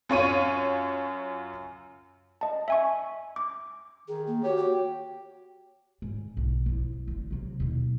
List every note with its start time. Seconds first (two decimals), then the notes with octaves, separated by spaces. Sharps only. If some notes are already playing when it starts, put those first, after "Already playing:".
0.09 F#2 F4 C#5 D#7
2.41 D#5 A5
2.68 E5 G#5 C#6
3.36 D6
4.08 D#3 G#4
4.27 A#3
4.44 F#4 G4 C#5
4.57 F#4 G5
6.02 G#2
6.37 B1
6.66 F3 E4
7.07 F#1 D3
7.30 C3 F#3
7.60 D#2 B2